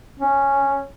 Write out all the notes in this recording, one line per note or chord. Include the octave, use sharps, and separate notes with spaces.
C#4